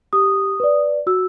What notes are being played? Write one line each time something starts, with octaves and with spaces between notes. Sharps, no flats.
G4 D#6
B4 D5
F#4 E6